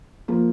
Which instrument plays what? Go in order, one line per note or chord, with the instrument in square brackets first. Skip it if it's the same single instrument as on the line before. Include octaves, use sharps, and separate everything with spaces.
[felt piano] F3 A#3